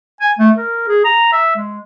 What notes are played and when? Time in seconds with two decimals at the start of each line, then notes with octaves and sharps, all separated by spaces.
0.21 G#5
0.39 A3
0.57 A#4
0.88 G#4
1.04 A#5
1.32 E5
1.56 G#3